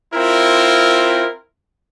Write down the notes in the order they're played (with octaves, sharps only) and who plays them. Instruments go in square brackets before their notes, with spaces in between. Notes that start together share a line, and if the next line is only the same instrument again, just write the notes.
[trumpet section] C4 E4 F4 A#4